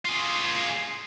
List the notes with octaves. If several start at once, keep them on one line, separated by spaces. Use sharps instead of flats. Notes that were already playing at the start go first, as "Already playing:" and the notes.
F4 G#4